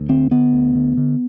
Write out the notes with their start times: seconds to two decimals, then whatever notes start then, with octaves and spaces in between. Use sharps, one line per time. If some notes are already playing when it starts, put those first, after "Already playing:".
Already playing: D2
0.09 D3 C4
0.31 D3 B3
0.53 D2
0.75 D3
0.97 D3